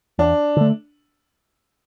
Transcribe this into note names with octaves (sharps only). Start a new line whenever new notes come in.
E2 D4
D3 A3